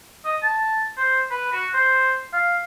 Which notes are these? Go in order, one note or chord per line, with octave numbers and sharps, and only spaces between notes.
D#5
A5
C5
B4
F#4
C5
F5